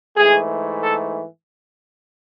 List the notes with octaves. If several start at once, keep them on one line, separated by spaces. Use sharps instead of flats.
G#2 E3 A3 G#4
A4